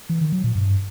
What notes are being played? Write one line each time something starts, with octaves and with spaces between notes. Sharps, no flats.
E3
D#3
F#3
A#2
G2